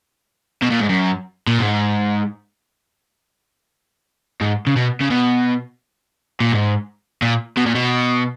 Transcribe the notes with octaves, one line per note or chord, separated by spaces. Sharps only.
B2
A#2
G#2
F#2
A#2
G#2
G#2
C#3
B2
C#3
B2
A#2
G#2
A#2
B2
A#2
B2